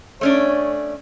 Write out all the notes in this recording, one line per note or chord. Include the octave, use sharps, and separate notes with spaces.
A3 C#4 D4 C#5